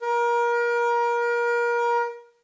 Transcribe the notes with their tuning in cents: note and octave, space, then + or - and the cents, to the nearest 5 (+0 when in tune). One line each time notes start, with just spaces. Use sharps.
A#4 +30